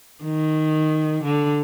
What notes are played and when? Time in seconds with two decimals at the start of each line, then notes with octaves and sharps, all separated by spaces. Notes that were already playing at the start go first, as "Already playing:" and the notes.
0.24 D#3
1.24 D3